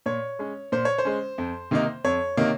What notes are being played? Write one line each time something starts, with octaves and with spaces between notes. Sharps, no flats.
A#2 C#5
G#3 C#4
A#2 C5
C#5
C5
G#3 C#4
F2
C3 D#3 A#3 D#4
F2 C#5
C3 D#3 A#3 D#4